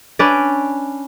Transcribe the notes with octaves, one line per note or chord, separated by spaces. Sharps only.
C#4 D4 B4 D5